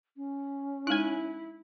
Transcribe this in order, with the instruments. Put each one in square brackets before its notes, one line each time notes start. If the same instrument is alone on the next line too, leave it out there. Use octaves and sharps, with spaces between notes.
[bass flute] C#4
[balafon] G#3 D#4 [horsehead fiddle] E4 [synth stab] G#5 F#6